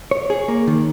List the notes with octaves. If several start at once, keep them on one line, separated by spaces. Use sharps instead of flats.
C#5
G#4
A#3
D#3